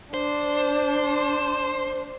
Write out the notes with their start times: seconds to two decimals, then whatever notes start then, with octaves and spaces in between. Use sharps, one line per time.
0.14 D4 C5